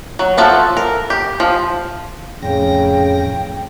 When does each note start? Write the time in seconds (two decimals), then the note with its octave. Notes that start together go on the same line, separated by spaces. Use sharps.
0.19 F#3
0.37 F3 A4 E5 F#5
0.77 A#4
1.10 G4
1.40 F3
2.43 F2 A2 C#3 G5 A#6